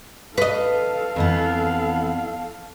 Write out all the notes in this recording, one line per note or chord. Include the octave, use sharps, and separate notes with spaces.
A4 B4 D#5 F5
F2 E3 B3